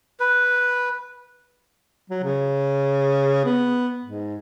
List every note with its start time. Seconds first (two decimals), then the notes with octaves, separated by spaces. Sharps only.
0.20 B4
2.10 F#3
2.23 C#3
3.45 B3
4.04 G#2